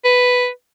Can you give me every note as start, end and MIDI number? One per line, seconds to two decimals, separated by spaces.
0.05 0.48 71